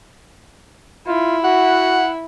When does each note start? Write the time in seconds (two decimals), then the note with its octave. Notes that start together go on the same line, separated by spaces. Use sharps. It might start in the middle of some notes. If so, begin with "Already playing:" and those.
1.07 E4 F4
1.44 F#4 F#5